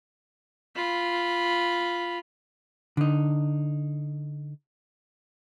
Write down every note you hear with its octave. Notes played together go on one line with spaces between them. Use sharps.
F4 B5
D3 D#4